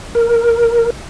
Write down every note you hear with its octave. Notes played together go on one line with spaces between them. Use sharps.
A#4